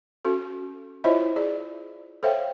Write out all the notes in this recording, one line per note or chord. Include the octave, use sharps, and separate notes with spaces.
C#4 F#4 A4
E4 F4 C5 C#5 D#5 E5
G#4 D5
A4 C5 C#5 E5 F5 G5